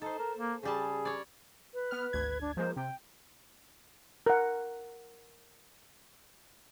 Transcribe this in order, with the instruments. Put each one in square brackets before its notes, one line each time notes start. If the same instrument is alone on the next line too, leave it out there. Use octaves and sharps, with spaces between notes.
[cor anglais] D#4 [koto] A4 C5
[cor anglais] A#4
A#3
[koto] C#3 G3 A5 [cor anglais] G#4
[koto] C#5 D5
[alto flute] B4
[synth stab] B3 F6
G#1 D2 G#6
[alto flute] D4
[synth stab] F3 G#3 A#3 [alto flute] C5
[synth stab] C3 [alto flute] G5
[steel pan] A#4 F#5